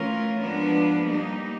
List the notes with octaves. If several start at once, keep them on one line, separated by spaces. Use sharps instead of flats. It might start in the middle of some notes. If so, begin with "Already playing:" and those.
Already playing: E3 A3 C#4 F4 A#4
F3 G#3 B3 D4
G3 A#3 D#4